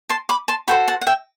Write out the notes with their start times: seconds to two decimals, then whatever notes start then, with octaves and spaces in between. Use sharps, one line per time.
0.09 A5 C6
0.29 B5 D6
0.48 A5 C6
0.68 F#4 A4 C5 G5 B5
0.88 F#5 A5
1.01 F#5
1.07 E5 G5